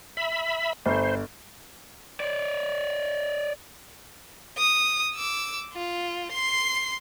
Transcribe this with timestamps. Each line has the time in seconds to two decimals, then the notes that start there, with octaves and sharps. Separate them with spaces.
0.17 E5 B5
0.86 G1 C5
2.20 C#5 D5
4.58 D#6
5.15 D6 E6
5.73 F4
6.32 C6 C7